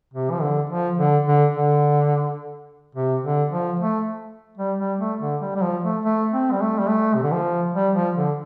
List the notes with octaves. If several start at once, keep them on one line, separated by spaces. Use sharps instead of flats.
C3
F3
D3
F3
D3
D3
D3
C3
D3
F3
A3
G3
G3
A3
D3
G3
G3
F3
A3
A3
C4
G3
A3
G3
A3
C3
D3
F3
G3
F3
D3